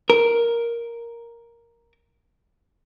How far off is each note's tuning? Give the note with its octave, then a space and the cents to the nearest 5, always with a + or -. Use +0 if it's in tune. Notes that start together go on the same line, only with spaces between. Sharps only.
A#4 +5